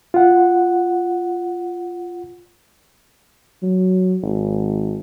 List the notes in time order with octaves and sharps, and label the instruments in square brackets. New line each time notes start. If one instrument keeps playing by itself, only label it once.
[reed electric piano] F4 F#5
[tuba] F#3
G#1